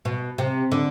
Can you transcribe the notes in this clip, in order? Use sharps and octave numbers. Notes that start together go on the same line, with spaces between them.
B2
C3
D3